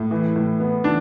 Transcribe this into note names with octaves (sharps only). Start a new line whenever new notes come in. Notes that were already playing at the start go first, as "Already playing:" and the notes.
Already playing: A2
E3
A2
B3
E3 D4